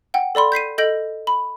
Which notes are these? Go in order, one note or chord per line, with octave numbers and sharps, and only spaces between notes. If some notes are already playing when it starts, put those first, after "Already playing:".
F#5 G5
A4 D5 B5 C6
G6 B6 C7 D#7
A4 D#5 G6 A#6 D7 F#7
B5